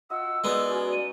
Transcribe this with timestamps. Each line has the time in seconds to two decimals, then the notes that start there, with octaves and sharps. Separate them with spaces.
0.10 F4 D#5 F#5 E6
0.44 G#3 B3 D#4 F4 A#4 D5
0.70 F#3 C#4 F#4
0.92 D#7